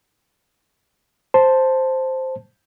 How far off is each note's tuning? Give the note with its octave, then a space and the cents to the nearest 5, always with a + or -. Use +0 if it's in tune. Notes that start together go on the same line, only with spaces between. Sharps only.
C5 +0 A5 +0